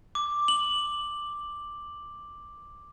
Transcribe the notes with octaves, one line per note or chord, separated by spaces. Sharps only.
D6
F#7